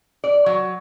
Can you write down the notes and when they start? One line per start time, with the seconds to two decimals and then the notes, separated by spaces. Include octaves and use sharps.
0.24 D5
0.46 F#3